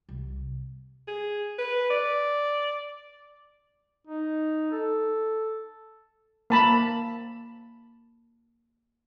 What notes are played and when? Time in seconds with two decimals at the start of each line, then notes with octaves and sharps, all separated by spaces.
0.09 C2
1.08 G#4
1.58 B4
1.90 D5
4.07 D#4
4.72 A4
6.50 A#3 A5 B5